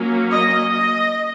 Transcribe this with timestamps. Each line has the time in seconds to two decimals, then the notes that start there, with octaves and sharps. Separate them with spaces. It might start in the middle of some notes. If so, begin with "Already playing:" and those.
Already playing: F#3 A#3 C#4
0.31 D#5
0.71 D#5